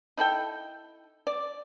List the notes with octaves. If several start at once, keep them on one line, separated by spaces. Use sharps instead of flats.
D#4 E4 A4 G5
D5